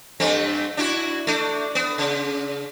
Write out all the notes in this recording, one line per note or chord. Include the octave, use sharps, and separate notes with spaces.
G2 A3 C4
D4 E4 F#4
A3 D4
B3
C#3